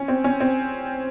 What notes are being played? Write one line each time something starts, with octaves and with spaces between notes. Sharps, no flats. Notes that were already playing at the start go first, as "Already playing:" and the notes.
Already playing: C#4
C4
C#4
C4